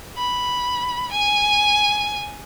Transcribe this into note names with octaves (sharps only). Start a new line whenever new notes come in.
B5
G#5